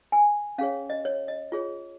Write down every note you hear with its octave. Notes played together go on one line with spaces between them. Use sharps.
G#5
C#4 G#4 C#5 F5
D#5
C#5
D#5
F4 G#4 C#5